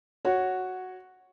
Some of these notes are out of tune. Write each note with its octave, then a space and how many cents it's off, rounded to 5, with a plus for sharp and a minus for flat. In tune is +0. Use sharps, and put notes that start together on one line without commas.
F#4 +0 C#5 -5